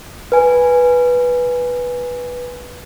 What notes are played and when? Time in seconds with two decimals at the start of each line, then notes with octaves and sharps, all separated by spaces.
0.32 B4 G#5